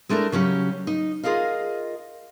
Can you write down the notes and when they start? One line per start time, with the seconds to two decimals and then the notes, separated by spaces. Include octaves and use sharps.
0.09 G#3 A3 D4 E4 A#4
0.32 C#3 F#3 C#4 G4
0.87 D#4
1.23 F4 G#4 A#4 D#5 F5